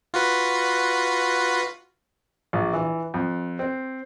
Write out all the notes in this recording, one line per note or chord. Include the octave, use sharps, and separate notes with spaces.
F4 F#4 B4
A#1
E3
F2
C4